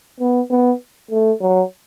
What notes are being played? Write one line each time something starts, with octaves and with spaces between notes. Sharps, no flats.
B3
B3
A3
F#3